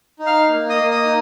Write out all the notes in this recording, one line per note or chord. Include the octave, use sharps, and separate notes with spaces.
D#4
F5 F6
A#3
D#5 D#6
A#3
D#5 D#6
D#4